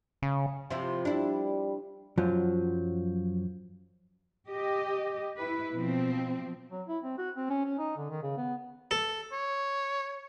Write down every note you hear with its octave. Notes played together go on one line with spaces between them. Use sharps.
C#3
C3 F3 E4
G3 D4 E4
F#2 F3 F#3
G4 D#5
E4 B4
B2 F3 C4
F#3
E4
C4
F#4
C4
C#4
C#4
D#4
D3
D#3
C#3
B3
A4
C#5